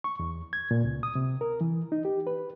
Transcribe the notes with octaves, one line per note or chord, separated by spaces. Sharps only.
C#6
E2
G#6
A#2
C#2
D#6
C3
A#4
E3
D#4
G4
B4